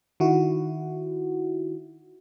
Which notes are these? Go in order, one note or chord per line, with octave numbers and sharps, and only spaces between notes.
D#3 E4 F#4